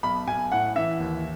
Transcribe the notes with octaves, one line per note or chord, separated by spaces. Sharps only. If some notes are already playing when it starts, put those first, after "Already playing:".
B1 B5
B1 G#5
A2 F#5
E3 E5
D#2